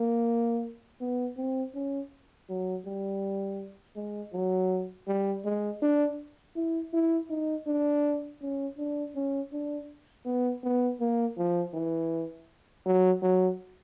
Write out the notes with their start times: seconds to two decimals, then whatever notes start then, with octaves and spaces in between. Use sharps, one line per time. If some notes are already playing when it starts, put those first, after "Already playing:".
Already playing: A#3
1.01 B3
1.37 C4
1.75 C#4
2.49 F#3
2.86 G3
3.96 G#3
4.33 F#3
5.07 G3
5.45 G#3
5.82 D4
6.56 E4
6.94 E4
7.30 D#4
7.67 D4
8.42 C#4
8.78 D4
9.15 C#4
9.53 D4
10.26 B3
10.63 B3
11.00 A#3
11.38 F3
11.74 E3
12.86 F#3
13.22 F#3